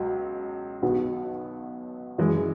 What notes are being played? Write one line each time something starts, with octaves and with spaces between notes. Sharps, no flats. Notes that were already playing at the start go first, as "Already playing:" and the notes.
Already playing: C#2 B2 F#3
B1 B2 F#3 B3 F#4
F#2 E3 G#3